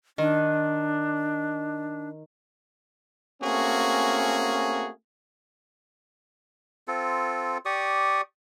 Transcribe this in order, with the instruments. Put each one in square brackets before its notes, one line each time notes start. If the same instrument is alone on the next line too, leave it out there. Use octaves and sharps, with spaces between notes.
[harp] D#3 [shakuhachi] D4
[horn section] A3 A#3 C4 C#4 F#4 G#4
[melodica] C4 F4 A4
G4 D5 C#6 D#6